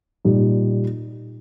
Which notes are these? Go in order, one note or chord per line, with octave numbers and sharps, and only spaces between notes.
A#2 G3 D#4